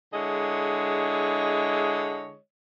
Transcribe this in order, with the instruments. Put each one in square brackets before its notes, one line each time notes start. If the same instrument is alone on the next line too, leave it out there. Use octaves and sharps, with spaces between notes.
[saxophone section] D3 G#3 E4 G#4 C#5 D#5